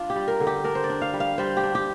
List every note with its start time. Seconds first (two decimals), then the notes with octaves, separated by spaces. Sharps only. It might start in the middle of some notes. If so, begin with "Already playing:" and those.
Already playing: D4 F4
0.10 G4
0.16 G3
0.28 A#4
0.40 D3
0.47 G4
0.64 D4 A#4
0.75 C5
0.84 D5
0.90 D4
1.01 F5
1.13 G3
1.20 F5
1.38 G3 C5
1.57 G4
1.63 D4
1.75 G4